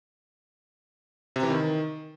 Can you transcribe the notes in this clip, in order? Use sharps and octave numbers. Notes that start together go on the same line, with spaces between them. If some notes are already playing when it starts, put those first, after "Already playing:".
C3
E3
D#3